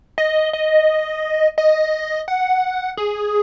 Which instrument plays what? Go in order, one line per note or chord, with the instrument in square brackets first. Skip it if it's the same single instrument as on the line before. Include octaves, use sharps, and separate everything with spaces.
[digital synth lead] D#5
D#5
D#5
F#5
G#4